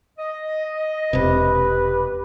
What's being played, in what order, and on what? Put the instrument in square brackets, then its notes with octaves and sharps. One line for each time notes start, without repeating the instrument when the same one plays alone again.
[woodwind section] D#5
[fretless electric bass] E1 C3 [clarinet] G4 [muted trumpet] B4